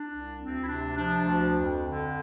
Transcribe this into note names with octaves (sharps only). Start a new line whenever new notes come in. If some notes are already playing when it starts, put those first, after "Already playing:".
Already playing: D4
C2
D2 C4
E4
C3 D4
F3 D4
D2
F2
D3